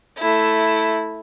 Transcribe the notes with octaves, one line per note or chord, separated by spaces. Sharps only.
A3 E4